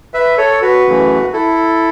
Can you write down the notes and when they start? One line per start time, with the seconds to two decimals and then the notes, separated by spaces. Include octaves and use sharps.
0.14 B4 E5
0.38 A4 C#5
0.62 F#4 B4
0.86 F#2 C#3 E3 A3
1.33 E4 A4